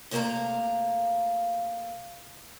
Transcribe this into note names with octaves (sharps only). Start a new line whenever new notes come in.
C3 A3 A#3 A#4 F5 A#5